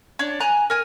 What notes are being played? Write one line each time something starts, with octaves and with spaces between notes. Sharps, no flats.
D4 C#5
G#5 A#5 F#6
A#4 G#5